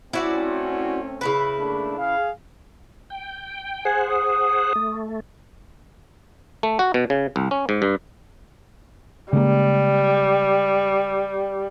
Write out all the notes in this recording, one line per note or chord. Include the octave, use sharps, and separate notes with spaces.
A3 C4 C#4 E4 F#4 D5
C#3 E4 B4
A3 A#3 D4
G#4 F5
G5
G#4 C5 F#5 G#5
D#6
A3
A3
F#4
B2
C#3
C2
C#4
G#2
G2
C#3 G3 G#3 A#3